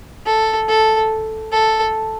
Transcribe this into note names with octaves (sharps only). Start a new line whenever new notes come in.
A4
A4
A4